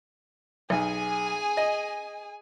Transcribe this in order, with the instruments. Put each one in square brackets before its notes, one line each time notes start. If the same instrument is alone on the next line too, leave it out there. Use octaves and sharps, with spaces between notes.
[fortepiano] B1 [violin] G#4 G#5
[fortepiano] D#5